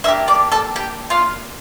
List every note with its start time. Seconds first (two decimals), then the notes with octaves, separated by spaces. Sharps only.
0.04 A#3 D4 G4 E5 E6
0.28 D5 D6
0.52 A4 A5
0.76 G4 G5
1.10 F4 F5